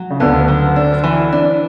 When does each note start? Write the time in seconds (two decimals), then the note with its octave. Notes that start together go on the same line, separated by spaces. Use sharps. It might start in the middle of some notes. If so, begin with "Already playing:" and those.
Already playing: F#3
0.10 C#3
0.20 D2 D3 B3
0.48 F#3
0.76 D4
1.04 E3
1.33 D4